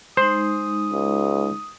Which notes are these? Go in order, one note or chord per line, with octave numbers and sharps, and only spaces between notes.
G#3 D#4 C5 D#6
C#2